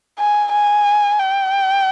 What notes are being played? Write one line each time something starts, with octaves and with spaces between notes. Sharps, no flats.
G#5
G#5
G5